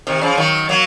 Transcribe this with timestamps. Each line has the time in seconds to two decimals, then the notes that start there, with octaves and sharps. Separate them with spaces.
0.07 C3 D#3
0.21 C#3 F3
0.38 D#3 F#3
0.69 F#3 A#3